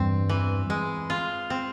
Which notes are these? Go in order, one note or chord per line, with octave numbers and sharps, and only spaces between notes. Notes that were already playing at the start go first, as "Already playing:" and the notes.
Already playing: E2 G2 C4
E3
G#3
F4
C4